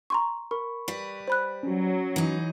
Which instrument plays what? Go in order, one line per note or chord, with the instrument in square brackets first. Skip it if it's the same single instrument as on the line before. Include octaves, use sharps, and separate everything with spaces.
[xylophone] A#5 C6 C#6
[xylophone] A#4 [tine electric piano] B5 C#6
[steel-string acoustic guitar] G3 B4
[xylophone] C5 B5 F#6
[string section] F#3 [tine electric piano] C#4 F#4
[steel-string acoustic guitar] E3 D#4